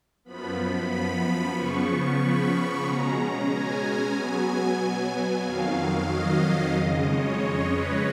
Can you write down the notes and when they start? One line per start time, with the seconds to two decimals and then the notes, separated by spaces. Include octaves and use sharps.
0.25 F#2 F3 B3 B5
0.90 B5
1.23 B5
1.54 C#3 F3 B3 C#6
2.19 B5
2.84 B2 G#3 C#4 A#5
3.49 G#5
4.15 B2 F#3 B3
5.43 F2 D#3 F#3 F5
6.08 D#5
6.74 F2 C#3 G#3 D#5
7.06 C#5
7.38 C#5
7.71 B4